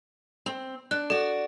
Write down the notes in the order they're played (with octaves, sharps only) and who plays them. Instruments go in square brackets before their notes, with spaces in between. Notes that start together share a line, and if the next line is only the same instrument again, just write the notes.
[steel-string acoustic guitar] C4
[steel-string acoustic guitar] D4 [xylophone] F#6
[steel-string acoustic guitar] F#4 D5 [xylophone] A4